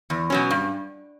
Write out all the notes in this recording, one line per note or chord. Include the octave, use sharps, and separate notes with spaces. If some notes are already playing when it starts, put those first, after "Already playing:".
E2
B2 F#3 C#4
G2